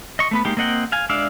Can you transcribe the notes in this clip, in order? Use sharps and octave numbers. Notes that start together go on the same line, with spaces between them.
D#5 C#6
A3 B3 B4
G#3 A#3 D#4 G4
A#3 C4 D#5 F#5 G5
F5 G#5
G#3 D4 D5 E5 F5